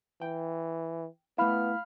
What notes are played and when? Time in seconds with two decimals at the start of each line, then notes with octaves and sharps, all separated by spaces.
0.22 E3 G5
1.38 A3 B3 E4 F5 B5 F6